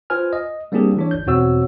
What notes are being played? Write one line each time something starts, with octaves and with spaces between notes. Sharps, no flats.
F4 B4 C5 G#5 F6
D#5
G3 A#3 C4 D4 G4 G#4
E3 D4 C#5
G1 G6
E2 B2 C4 F#4 C#5 E6